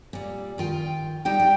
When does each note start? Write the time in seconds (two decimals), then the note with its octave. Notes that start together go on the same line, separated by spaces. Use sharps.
0.13 A#2 G3
0.58 D#3 F4 G5
1.25 G3 D#4 G4 G5
1.40 G3